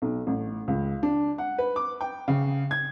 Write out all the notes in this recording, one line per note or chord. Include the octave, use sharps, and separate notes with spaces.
B1
A1
C#2
D4
F#5
B4
D6
G5
C#3
G#6